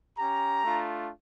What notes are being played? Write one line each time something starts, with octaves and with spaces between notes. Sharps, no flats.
C#4 G4 A#5
A3 D4 F4